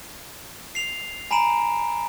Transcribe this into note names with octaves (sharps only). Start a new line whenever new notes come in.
C7 F7
G#5 A#5 B5 D7 E7